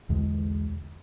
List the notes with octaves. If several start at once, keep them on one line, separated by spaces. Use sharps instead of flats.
B1 E2 D3 G#3